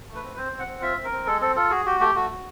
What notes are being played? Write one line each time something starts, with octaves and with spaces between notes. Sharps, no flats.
A3
B4
C4
C4 C5
C4
F#5
C4
F4 E5
C4
A#4
C4
G#3 A4
C4 A4
F4 A4
F#4 G#4
F#4 G4
A3 G4
A3 F#4
F#4